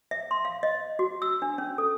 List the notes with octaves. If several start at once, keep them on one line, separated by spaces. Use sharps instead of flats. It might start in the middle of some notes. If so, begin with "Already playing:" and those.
E5
C6
F5
D#5
F#4
E6
D4
C#4
A4